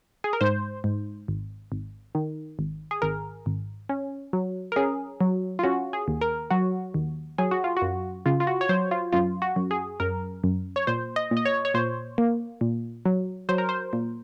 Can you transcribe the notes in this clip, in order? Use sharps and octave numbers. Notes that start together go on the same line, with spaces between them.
G#4
A#4
G#2 C5
G#2
G#1
G#1
D#3
G#1
G#4
G#1 A#4
G#1
C#4
F#3
A#4
C#4 G#4
F#3
F4
C#4 F#4
G#4
D#2
A#4
F#3 F#4
D#2
F#3 G#4
F#4
F4
F#4
F#2
C#3 F4
F4
F#4
C#5
F#3 C5
F4
F#2 F4
F#4
F#2
G#4
F#2 A#4
F#2
C#5
A#2 C5
D#5
A#2
D#5
C#5
C#5
A#2 C5
A#3
A#2
F#3
F#3 C5
A#4
C5
A#2